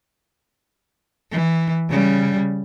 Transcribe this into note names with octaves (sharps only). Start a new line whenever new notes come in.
E3
C#3 G3